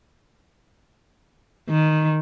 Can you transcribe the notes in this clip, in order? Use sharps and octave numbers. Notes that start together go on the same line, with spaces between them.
D#3